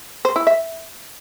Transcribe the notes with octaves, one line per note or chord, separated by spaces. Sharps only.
C5
E4
E5